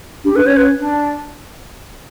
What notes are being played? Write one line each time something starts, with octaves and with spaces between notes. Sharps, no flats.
D4 G4
D4 B4
C#4 C#5
B4
D4